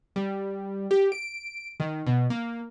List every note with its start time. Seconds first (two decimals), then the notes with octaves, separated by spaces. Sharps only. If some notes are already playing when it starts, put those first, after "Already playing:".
0.16 G3
0.91 G4
1.12 D7
1.80 D#3
2.07 B2
2.30 A#3